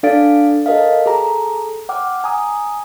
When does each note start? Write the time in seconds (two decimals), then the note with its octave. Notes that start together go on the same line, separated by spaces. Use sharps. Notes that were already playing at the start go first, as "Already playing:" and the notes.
0.03 D4 A4 D5 F5 A6 D7
0.66 A4 A#4 D#5 F5
1.06 G#4 A4 A#5
1.89 F#5 G5 D6 F6
2.24 G#5 A#5 D#6